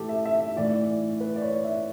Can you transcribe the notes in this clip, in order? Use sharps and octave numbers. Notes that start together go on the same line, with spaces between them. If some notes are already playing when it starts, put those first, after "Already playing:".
Already playing: A2 E3 G4 A4
E5
E5
E5
A2 E3 D5
B4
D5
C#5
E5